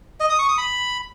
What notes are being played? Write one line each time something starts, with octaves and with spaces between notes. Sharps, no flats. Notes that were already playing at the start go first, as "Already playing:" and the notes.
D#5
D#6
C#6
D#6
B5